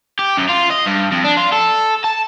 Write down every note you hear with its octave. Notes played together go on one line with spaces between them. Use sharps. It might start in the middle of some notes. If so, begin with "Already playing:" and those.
G4
F#2
F4
D#5
G2
F2
D4
F4
A4
A5